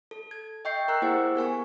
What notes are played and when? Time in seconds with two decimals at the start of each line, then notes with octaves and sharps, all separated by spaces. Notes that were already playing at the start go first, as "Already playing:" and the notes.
0.11 A4
0.31 G#6
0.65 D#5 E5 G5 C#6 G6 C7
0.88 A#4 A#5 E6 F#6
1.02 A#3 E4 G4 G#4 C5 F#5
1.36 B3 A#4 G#5 C#6